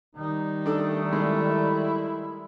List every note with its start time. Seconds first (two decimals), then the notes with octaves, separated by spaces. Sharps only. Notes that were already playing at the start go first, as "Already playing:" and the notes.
0.15 D#3 G3 D#4
0.66 A3 D4 A4
1.13 G#3 E4